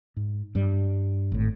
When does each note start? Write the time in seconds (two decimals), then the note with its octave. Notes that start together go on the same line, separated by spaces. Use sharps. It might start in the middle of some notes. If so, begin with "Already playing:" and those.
0.16 G#2
0.55 G2 G3
1.32 G#1 A2